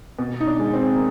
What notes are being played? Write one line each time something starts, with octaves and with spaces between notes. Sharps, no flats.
B2
D#4
D4
G#3
C4
A#3